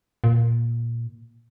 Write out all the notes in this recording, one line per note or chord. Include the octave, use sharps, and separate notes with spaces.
A#2